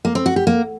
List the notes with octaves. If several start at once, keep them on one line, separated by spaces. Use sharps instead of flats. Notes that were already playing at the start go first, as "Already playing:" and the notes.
A#3
C4
F#4
G4
A#3